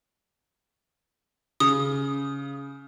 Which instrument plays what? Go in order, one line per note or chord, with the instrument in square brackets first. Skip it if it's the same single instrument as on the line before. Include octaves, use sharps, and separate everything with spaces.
[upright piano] C#3 [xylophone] D#6